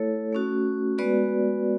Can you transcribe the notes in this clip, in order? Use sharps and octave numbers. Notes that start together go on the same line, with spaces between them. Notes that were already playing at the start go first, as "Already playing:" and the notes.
Already playing: A3 E4 A4 C#5
A3 C#4 F#4
G#3 B3 F#4 B4 D5